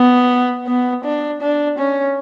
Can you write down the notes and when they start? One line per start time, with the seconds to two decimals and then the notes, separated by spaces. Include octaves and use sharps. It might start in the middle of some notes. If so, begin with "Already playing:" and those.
Already playing: B3
0.67 B3
1.04 D4
1.41 D4
1.78 C#4